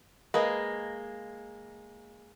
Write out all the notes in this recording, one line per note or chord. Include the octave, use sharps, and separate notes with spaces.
G#3 A#3 B4 D#5